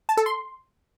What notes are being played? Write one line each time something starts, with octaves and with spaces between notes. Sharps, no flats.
A5
A4
C6